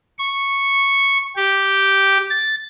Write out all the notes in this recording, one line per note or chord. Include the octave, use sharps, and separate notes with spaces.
C#6
G4
A6